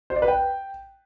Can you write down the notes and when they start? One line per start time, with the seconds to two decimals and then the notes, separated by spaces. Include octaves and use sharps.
0.10 C5
0.16 D5
0.22 B4
0.28 G5